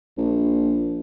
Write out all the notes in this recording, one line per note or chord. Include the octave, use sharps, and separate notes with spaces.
A#1